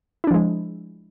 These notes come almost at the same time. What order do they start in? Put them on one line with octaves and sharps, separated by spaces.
E4 D4 F3 G#3